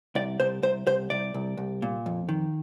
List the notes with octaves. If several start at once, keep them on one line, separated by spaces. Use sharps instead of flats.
C2 D5
C2 C5
C2 C5
C2 C5
C2 D5
C2
C2
A#2
F2
D#3